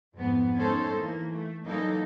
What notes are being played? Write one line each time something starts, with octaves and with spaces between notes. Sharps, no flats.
F2 G#2 B3
G#3 C#4 D#4 A4 C5
E3 A#3
A3
E3 F#3 A#3 D#4 A4